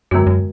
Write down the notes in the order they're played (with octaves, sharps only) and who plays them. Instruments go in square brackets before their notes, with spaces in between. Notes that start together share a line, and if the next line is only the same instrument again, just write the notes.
[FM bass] F#2 [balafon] D3 G#3 B3 F#4
[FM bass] F#2